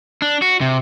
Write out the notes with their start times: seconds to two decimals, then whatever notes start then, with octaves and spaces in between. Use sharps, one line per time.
0.22 D4
0.42 F#4
0.61 C3